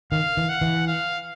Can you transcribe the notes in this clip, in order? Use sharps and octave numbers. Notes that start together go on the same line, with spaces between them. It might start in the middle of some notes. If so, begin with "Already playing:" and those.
D#3 F5
E3
F#5
E3
F5